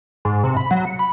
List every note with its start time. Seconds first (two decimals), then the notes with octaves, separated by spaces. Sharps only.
0.25 G#2
0.44 C3
0.57 B5
0.71 F#3
0.85 C#7
0.99 B5